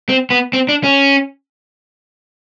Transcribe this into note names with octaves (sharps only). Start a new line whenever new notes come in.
C4
B3
C4
D4
C#4